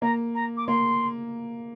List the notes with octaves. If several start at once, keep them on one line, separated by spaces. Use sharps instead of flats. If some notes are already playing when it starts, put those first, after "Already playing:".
A#3 A#5
A#5
D6
A#3 C6